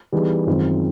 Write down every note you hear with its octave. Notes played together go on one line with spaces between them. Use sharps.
E3 G3 B3 D#4 G#4
F#2 D#3 G#3 C4 F4